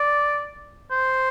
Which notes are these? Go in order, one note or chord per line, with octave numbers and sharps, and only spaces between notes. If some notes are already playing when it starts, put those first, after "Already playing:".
Already playing: D5
C5